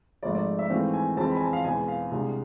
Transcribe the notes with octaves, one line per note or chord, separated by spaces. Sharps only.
G#1 G#2 F3 A3 D5
D5
E5
G#2 E3 A3 C4 F5
G#5
F2 E3 G#3 C4 A5
B5
G#5
A5
F5
E2 B2 G#3 B3 G#5
F5
C2 C3 G#3 D4